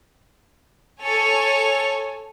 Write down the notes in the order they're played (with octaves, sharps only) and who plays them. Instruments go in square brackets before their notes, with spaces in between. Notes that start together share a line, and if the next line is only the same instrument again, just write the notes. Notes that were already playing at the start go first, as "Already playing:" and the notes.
[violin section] A4 C#5 G#5 [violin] C#7 F7